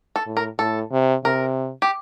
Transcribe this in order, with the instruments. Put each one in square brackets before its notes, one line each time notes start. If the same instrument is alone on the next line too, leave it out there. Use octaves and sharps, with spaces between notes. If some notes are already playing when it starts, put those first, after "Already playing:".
[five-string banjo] A4
[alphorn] A2
[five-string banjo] A#4
[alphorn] A2 [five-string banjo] A4
[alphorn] C3
[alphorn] C3 [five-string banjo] A#4
[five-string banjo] G4